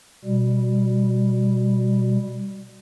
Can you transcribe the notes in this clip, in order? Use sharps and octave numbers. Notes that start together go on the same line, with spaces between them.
B2 G3